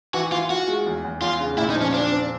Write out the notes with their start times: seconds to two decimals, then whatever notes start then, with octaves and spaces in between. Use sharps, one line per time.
0.14 E3 F#4
0.32 E3 F4
0.50 F4 F#4
0.68 G#3
0.86 E2
1.04 E2
1.22 E2 F4
1.40 C#3
1.57 A#2 E4
1.70 D#4
1.75 F3
1.82 C#4
1.94 C4 D4
2.12 C4